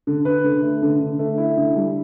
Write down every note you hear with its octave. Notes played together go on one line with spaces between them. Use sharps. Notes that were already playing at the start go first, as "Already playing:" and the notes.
D3
B4
D3
A3
D3
D3
A3
E4
D3
G3